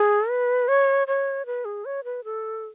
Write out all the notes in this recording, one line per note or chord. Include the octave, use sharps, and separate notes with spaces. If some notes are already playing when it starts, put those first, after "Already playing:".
Already playing: G#4
B4
C#5
C#5
B4
G#4
C#5
B4
A4